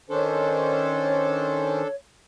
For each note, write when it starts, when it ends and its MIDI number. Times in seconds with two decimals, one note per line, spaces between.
0.10 1.82 51
0.10 1.82 61
0.10 1.87 62
0.10 1.87 69
0.10 1.82 72
0.10 1.95 73